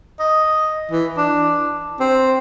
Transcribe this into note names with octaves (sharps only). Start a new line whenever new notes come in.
D#5
E3
D4
C4